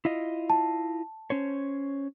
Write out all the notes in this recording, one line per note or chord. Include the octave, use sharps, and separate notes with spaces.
E4 F4 D#5
A5
C#4 C5 C#5